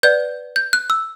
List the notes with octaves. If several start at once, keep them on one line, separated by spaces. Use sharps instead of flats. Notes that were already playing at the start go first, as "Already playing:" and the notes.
B4 D5 F#5 G6
G6
F#6
E6